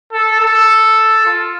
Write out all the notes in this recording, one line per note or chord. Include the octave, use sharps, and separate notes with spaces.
A4
A4
F4